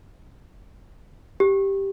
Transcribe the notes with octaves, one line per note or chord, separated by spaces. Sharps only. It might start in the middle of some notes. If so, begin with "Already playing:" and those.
G4